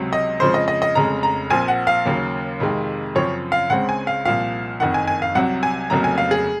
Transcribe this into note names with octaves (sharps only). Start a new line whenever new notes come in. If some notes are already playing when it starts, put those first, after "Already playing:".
Already playing: C#2 C3 F#3
D#5
F2 C#3 F3 G#3 C5
D#5
D#5
D#5
F1 F2 C#3 G#3 A#5
A#5
A#1 A#2 F3 C4 G#5
F#5
F5
D#2 C#3 F#3 A#3
F2 C3 D#3 G#3
F#2 C#3 F3 C4 C#5
F5
C#2 C#3 G#3 C4 F#5
G#5
F5
C2 A#2 F3 F5
F#1 F2 D#3 F#5
G#5
G#5
F5
C2 C3 F#3 F#5
G#5
F1 F2 C#3 F#3 A#3 A#5
G#5
F5
G#4